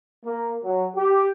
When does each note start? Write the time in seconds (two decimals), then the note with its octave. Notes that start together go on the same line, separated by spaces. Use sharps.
0.25 A#3
0.64 F#3
0.96 G4